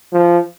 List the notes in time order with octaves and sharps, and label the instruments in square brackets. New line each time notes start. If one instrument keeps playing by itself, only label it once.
[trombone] F3